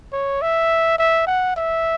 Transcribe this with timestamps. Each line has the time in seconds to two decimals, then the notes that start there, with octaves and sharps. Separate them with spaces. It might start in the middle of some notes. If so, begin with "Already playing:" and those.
0.12 C#5
0.42 E5
0.98 E5
1.27 F#5
1.56 E5